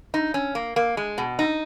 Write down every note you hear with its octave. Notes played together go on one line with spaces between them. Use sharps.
D#4
C#4
A#3
A#3
G#3
B2
D#4